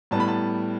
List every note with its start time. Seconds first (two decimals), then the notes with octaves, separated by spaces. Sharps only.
0.11 A2 G3 B3 A5
0.20 B5
0.28 A5